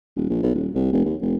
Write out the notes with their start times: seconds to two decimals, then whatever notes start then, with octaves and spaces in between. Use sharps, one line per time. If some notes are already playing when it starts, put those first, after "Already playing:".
0.16 D#1
0.29 A#1
0.43 B1
0.55 D#1
0.75 C2
0.92 F1
1.05 D#2
1.21 F1